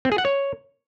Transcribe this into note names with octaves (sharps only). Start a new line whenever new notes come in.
C4
G#4
F#5
C#5